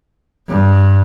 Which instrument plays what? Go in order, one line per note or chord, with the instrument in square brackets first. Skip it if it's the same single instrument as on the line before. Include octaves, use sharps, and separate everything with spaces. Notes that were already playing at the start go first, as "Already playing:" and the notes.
[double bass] G2